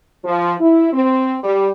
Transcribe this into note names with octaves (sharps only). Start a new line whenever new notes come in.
F3
E4
C4
G3